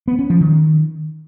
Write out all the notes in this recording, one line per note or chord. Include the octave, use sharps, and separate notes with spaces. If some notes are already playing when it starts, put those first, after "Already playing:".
B3
C#4
F3
D#3